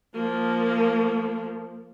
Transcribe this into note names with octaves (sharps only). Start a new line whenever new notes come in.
F3 A#3